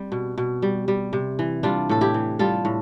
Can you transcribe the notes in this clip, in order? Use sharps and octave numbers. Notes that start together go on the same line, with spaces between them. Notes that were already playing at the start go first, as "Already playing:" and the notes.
Already playing: G3 C4
B2
B2
G3
G3
C3
E3
G3 D4 F4
A2 A4
E4 G4
E3
G3 F4 A4
A2